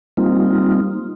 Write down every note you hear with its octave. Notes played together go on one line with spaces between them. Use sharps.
G3 A#3 C4 D#4 F4